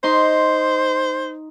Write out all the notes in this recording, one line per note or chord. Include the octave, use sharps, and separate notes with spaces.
D#4 C5 C6